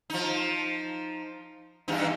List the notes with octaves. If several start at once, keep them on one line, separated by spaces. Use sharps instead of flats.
F3 D#4
E2 G2 D#4